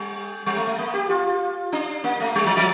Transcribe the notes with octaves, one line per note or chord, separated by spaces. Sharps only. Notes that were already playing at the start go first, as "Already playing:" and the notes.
Already playing: G3
G3
A3
A3
A#3
G4
F4
D4
A#3
A3
G3
F3
F3